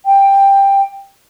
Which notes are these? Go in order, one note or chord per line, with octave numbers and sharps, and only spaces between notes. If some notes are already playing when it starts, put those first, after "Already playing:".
G5